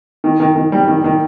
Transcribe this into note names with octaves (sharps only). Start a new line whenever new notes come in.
D#3
D#3
D#3
G3
D#3
D#3